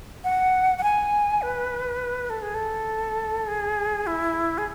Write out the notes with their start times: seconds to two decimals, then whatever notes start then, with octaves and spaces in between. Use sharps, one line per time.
0.24 F#5
0.78 F#5
0.83 G#5
1.42 B4
2.30 A4
2.42 G#4
2.54 A4
3.48 G#4
4.07 E4
4.58 G#4